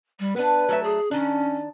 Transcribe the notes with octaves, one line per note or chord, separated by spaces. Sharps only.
G3
B3 D4 B4
F#3 A3 E5
G#4
D#3 C#4 D4